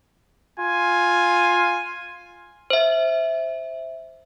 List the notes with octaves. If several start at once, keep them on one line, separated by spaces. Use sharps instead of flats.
F4 G#5
C5 E5